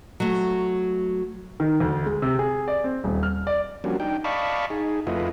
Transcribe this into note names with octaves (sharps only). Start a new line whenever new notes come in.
F#3 A3
D#3
D2
G#3
C3
G#4
D5
C4
D#1
F6
D5
F3 G3 A#3 C#4 D4 F#4
D4 D#4 G5
D5 D#5 F5 A5 B5 C#6
D#4 G#4
F2 A3 E4 F4 B4 D#5